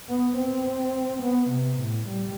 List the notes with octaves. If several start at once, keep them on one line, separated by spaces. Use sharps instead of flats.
B3
C4
B3
C3
A2
G3